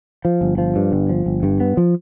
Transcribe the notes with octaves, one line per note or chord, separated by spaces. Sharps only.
F3
G1
F3
G2
G1
F3
G1
G2
B3
F3